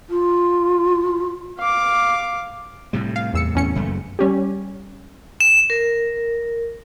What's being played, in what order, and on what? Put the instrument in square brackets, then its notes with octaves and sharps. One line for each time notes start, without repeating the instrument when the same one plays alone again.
[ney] F4
[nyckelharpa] F5 D6
[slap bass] A2 C3 G3
[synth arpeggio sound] F5
E2 E6 C#7
E2 C#4 C#7
[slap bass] F#1 F#2 A3
[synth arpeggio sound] G3 C#4 G4
[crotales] E7
[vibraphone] A#4